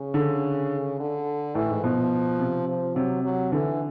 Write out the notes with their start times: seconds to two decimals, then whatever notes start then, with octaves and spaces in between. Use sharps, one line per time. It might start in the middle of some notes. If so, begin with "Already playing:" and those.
Already playing: C#3
0.14 D3
0.99 D3
1.55 A2 E3
1.69 G#2
1.83 B2 F3
2.40 C3
2.68 F3
2.95 C3 F#3
3.24 F#3
3.52 D3 E3